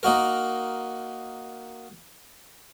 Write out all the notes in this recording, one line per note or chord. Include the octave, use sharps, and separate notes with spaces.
A#3 D#4 F#4 A#4